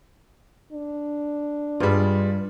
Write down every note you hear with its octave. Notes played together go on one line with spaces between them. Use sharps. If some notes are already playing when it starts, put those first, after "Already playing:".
D4
E2 G2 G3 G#3 F4